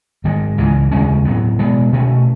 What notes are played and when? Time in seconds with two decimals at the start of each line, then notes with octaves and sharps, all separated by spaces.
0.24 G#2 D#3 G#3
0.58 C#2 C#3 E3 G#3
0.92 D#2 C#3 G#3 C#4
1.25 A2 F#3 B3
1.59 B2 G#3 B3
1.93 B2 A3 C#4